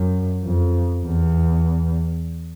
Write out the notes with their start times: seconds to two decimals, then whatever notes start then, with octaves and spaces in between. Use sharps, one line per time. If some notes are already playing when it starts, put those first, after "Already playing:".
Already playing: F#2
0.43 F2
1.05 E2